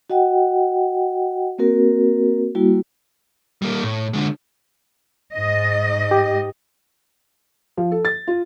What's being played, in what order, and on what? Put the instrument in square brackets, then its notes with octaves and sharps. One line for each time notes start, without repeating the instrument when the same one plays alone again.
[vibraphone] F#4 D#5 F#5 G5
A#3 C4 F#4 A#4
G3 A#3 E4 F#4
[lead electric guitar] G3 A#3
A2
D3 G#3
[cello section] G#2 D#5
[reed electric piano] G4
[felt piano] F3
A4
A6
F4